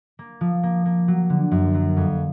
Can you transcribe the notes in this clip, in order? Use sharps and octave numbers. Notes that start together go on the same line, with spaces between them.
A#3
F3
A#3
A#3
F#3
D3
F#2
F#3
F2